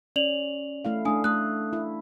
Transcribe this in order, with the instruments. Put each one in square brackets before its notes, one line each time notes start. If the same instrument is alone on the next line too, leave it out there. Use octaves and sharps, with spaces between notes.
[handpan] C#4 [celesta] D5 F7 F#7
[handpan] A3 E4 F5
[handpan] A3 D4 [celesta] G#5 D#6
[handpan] A3 A4 [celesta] D#6 F#6
[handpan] E4